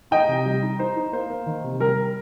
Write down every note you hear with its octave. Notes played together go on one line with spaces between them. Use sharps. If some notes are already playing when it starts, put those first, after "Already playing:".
D#4 D#5 G5
C3
G3
D#4
D#4 C5
D#4
A#3 C5
A#3
D#3
C3
G3 A#4